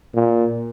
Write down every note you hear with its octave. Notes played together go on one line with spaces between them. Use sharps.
A#2